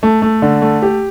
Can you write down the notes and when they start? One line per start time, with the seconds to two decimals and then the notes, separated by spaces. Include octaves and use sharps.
0.03 A3
0.22 A3
0.42 D3
0.62 A3
0.82 G4